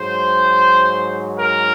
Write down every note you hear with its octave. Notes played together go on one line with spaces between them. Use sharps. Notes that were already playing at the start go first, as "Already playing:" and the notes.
Already playing: G#2 F#3 C5
A#4